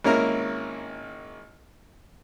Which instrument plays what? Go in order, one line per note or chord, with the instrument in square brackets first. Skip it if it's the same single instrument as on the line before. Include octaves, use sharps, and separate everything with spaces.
[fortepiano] G#1 A#3 C#4 E4 A#4 A#5